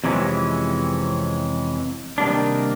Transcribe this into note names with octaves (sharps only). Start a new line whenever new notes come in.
F2 C3 E3 G#3 C#4
C3 D#3 G3 A#3 D4